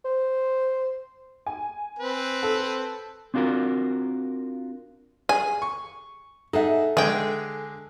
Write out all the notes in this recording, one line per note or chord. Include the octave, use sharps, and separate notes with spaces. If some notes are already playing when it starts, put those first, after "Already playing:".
C5
G#5
C4 B4
A4
C4 D4 F4 F#4 A#4
G#4 G#5
C#6
D#4 G#4 A4 E5 F#5
D3 G#3 G#4 G5